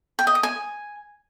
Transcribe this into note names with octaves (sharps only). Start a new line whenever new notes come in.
G5
D#5
D#6
G#5